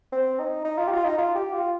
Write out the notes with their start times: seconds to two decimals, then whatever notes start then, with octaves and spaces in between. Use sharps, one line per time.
0.12 C4
0.39 D#4
0.64 D#4
0.78 F4
0.87 G4
0.92 F4
1.05 D#4
1.18 F4
1.35 G4
1.53 F4